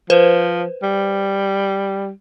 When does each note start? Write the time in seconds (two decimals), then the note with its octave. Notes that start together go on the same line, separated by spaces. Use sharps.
0.10 F3 B4 C5
0.83 G3